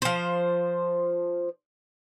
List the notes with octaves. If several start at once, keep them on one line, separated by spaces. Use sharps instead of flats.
F3 C5